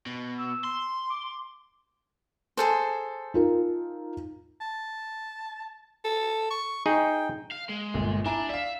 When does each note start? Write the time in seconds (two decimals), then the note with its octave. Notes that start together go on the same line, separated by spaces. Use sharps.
0.06 B2
0.38 E6
0.64 C6
1.10 D6
2.57 G#4 A4 C5
3.34 D#4 F4 A#4
4.61 A5
6.04 A4
6.51 C#6
6.86 D#4 G#4 G5
7.52 F5
7.69 G#3
7.94 G1 A#2
8.25 D4 E4 G#5 A#5
8.49 D5 E5 F5